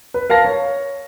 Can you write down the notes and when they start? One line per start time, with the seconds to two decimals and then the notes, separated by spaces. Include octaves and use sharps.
0.14 B4
0.30 A#4 F5 A5 A#6
0.45 C#5